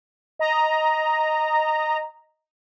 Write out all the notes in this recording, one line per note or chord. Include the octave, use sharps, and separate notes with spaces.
D#5 A#5